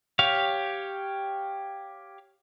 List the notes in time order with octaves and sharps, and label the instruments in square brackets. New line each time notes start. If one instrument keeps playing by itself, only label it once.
[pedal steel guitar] G4 C#5 F5